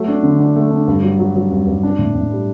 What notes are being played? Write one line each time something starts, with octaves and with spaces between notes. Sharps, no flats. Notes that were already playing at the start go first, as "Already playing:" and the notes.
Already playing: F#3 A3
D4
D3
D4
A3
D4
G2
F#3
F#3
F#3
G2
G2
D4
A2
A2
G3